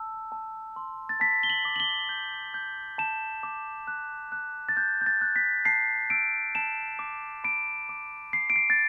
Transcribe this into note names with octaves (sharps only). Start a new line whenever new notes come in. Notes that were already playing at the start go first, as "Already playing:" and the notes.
Already playing: A5 E6
A5
C6
A6
A5 B6
G7
F#7
D6
F#7
G7
G6
G6
A5 E7
D6
F#6
F#6
A6
F#6 G6
G6
A6
F#6
B6
A5 C7
E6 D7
A5 E7
D6
B5 D7
D6
B5 C7
D7
C7
A6